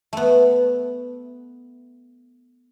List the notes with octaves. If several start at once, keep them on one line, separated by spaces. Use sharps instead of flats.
A3 B3